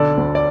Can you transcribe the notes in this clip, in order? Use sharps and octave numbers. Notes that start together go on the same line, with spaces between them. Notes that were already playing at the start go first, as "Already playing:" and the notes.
Already playing: B1 D3 A4 D5
D2
D5